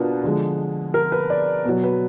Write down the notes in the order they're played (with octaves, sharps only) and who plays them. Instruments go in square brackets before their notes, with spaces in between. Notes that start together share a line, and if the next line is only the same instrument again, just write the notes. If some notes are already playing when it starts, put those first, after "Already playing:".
Already playing: [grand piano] B2 B3 D4 F4 A#4 B4
D3 F3 G#3
A#4
B4
D5
B2 F#3 B4
B4